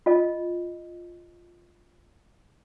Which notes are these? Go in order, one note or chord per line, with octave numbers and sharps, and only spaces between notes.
F4 D#5